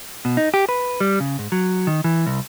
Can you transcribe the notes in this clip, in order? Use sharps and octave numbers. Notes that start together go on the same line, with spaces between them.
B2
D#4
G4
B4
G3
C#3
G#2
F#3
D#3
E3
C2